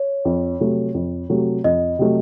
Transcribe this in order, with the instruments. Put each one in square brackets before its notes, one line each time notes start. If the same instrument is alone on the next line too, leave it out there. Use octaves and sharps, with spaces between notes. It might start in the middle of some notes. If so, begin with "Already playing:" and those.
Already playing: [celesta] C#5
[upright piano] F2
C3 F#3 A3
F2
C3 F#3 A3
[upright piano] F2 [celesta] D#5
[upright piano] C3 F#3 A3